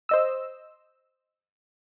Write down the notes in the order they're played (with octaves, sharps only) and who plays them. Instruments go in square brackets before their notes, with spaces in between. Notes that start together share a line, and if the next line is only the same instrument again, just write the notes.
[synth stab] C5 D#5 E6